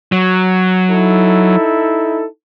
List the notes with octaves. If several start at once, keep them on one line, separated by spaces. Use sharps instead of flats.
F#3
D#4 E4 A4